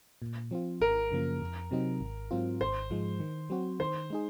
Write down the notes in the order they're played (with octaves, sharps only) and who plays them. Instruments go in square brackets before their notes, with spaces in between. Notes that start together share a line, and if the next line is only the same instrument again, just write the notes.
[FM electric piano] A#2
F3 C4 F4
[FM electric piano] G#1 [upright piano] A#4
[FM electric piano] F#2 C#3 F3 A#3
F2
C3 F#3 C4 D#4
G#1
G#2 F#3 C4 F4
[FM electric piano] G#1 [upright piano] C5
[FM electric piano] G#2 F3 G#3
D#3
F#3 C4 F#4
[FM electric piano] D#3 [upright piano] C5
[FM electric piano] G#3 D#4 G#4